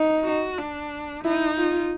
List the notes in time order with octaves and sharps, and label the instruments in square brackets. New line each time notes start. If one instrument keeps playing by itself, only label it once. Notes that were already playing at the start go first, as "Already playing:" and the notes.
Already playing: [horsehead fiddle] D#4
[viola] F#4
D4
[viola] D#4 [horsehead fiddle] E4
[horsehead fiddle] F4